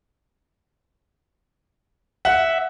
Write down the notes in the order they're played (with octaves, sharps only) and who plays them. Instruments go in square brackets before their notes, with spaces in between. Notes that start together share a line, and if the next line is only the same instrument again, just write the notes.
[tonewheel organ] E5 [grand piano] F#5